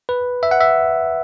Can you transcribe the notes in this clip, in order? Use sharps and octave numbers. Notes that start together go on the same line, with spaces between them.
B4
E5
F#5
E5